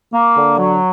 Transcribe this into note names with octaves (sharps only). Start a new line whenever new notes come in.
A#3
D3
F#3